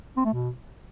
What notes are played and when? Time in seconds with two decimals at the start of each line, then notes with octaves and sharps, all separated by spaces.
0.17 C4
0.25 A3
0.33 B2